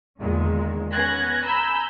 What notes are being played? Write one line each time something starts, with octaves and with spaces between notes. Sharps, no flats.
E2 A#2 D3 D#3 G#3
B3 C#4 F#6 G#6 A#6
G#5 A#5 B5 E6 G6